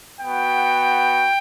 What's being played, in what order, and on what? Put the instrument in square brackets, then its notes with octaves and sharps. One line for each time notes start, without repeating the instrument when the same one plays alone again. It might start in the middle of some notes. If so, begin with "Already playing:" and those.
[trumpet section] B3 F#4 G5